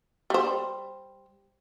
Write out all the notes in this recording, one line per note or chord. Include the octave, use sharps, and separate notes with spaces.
G3 C5